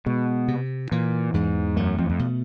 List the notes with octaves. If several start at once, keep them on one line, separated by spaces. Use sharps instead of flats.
B2 G#3
C3
A#2 E3
E2 G#2
F#2 A3
F2
F2
B2